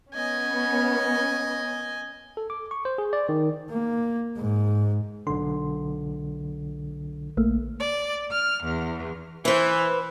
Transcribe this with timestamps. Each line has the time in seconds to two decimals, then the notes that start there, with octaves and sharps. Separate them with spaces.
0.14 B3 C#4 D#5 G#5
2.37 A4
2.50 D6
2.71 C#6
2.85 C5
2.98 G#4
3.13 D5
3.29 D#3
3.70 A#3
4.37 G#2
5.27 B1 D3 C6
7.37 A#1 A3 A#3
7.79 D5
8.31 F6
8.64 E2
9.45 E3 B4 C5